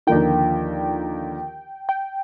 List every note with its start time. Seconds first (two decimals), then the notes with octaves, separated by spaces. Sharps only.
0.07 D#2 D3 F3 A#3 F4 G5
1.89 G5